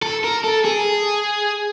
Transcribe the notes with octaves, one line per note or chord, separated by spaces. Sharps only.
A4
A#4
A4
G#4